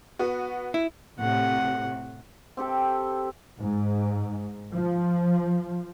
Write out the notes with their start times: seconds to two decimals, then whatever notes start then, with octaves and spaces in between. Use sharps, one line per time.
0.19 B3 F#4
0.74 E4
1.20 A2 C3 F#5
2.57 C4 G4 A4 G5
3.60 G#2
4.74 F3